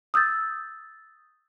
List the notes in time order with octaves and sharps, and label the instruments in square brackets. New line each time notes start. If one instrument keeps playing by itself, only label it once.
[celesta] D#6 E6 G6 A6